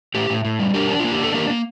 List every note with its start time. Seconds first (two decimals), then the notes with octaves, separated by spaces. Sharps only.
0.15 A2 G4
0.30 A2
0.45 A2
0.59 G3
0.74 D4 G4 A#4
0.90 D4
1.00 A#3 F4
1.12 G4
1.19 D4 A4
1.34 A#3 G4 A#4
1.50 A#3